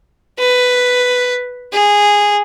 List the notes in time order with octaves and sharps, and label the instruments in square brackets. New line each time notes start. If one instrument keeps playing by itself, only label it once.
[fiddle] B4
G#4